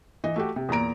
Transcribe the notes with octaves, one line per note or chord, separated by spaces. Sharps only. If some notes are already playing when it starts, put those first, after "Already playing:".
E3 D#5
A3 F#4 G4
C3
E2 A#2 A#3 A#5 D7